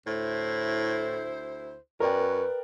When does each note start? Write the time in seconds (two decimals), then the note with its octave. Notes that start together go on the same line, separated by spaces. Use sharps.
0.07 D2 A2 E4 C5
2.00 F#2 A#4 B4 D5 G5